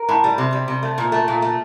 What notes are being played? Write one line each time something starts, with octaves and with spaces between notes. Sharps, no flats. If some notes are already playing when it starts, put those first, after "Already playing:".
Already playing: A#4
A2
G3
C3
G3
C3
A3
A#2
A3
A#2
A3